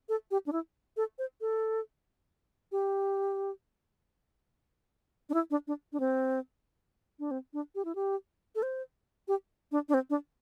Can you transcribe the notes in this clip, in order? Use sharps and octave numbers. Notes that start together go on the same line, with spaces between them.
A4
G4
D4
E4
A4
C5
A4
G4
D4
E4
D4
D4
D4
C4
D4
C4
D4
G4
E4
G4
A4
C5
G4
D4
D4
C4
D4